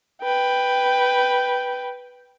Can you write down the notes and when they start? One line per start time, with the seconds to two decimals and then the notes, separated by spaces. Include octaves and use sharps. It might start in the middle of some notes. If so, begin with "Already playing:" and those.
0.22 B4 G5